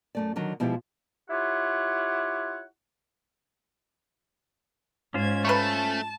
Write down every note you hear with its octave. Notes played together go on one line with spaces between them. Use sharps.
F#2 A3 D5
D3 D#3 F#3
B2 F3 G#3 E4 F4 G4
E4 F4 G4 C#5 F#5
G#2 C#4 F4 C5 G#6
A3 B4 A5 A#5 C#6